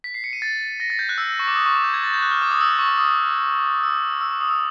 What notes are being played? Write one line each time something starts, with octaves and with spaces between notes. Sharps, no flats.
B6
C7
C#7
D#7
A6
A#6
A6
G6
F#6
E6
C#6
D6
D#6
C#6
D6
G6
G#6
A6
G6
F#6
F6
D6
D#6
E6
D#6
C#6
D6
D#6
E6
E6
D6
D#6
E6